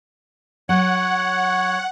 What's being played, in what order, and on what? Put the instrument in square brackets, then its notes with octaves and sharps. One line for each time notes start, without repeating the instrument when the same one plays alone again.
[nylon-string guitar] F#3 [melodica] C#5 [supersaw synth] F#5